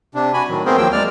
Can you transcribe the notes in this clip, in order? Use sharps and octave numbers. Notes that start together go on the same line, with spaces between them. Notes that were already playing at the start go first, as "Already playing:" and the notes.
C3 D4
F#4 G#5 B5
A2 D#3 F#3
A3 B3 C4 G#4 A#4 C5
D#2 F3 F#3 A#3 G5 E6
G#3 D5 F6